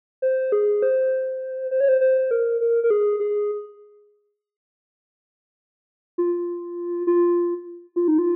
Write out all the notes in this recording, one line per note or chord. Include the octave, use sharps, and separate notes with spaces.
C5
G#4
C5
C5
C#5
C5
C5
A#4
A#4
A#4
G#4
G#4
F4
F4
F4
D#4
F4